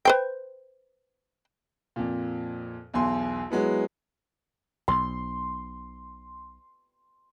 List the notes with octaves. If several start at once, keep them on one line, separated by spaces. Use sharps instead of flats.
B4 C5 G5
F2 A#2
B1 E2 G#5 C6
F#3 G#3 B3 E4
B1 C6